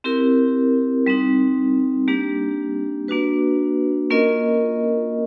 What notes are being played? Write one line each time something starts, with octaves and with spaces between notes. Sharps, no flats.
C4 E4 G4 A#4
G3 C4 D#4
G3 A#3 D4 G4
A#3 D4 F#4 B4
A#3 C#4 F4 A#4 D#5